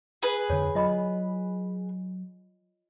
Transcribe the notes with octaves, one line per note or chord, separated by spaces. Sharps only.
G#4 B4
F2 D3 C#5
F#3 F4 D#5 B5